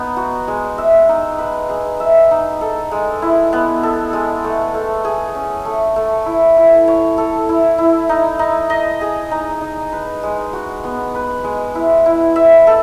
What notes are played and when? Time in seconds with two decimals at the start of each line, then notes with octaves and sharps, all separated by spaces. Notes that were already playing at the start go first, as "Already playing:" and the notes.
Already playing: B3 D#4
0.16 F#4
0.48 G#3
0.78 E5
1.09 D#4
1.38 B4
1.69 G#4
2.00 E5
2.31 D#4
2.61 A4
2.91 G#3
3.22 E4
3.53 B3
3.83 A4
4.13 G#3
4.44 A3
4.74 A3
5.05 G#4
5.35 C#4
5.65 A3
5.96 A3
6.26 E4
6.57 E4
6.88 C#5
7.18 A4
7.49 E4
7.78 E4
8.09 D#4
8.39 D#4
8.70 D#5
9.01 G#4
9.31 D#4
9.61 D#4
9.92 B4
10.23 G#3
10.53 F#4
10.84 B3
11.15 B4
11.44 G#3
11.75 E4
12.06 E4
12.36 E5
12.67 A4